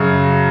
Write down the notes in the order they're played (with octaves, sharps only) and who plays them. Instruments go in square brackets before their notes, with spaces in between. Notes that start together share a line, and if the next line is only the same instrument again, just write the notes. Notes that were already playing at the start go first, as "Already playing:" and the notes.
Already playing: [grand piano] F#2 C#3 F#3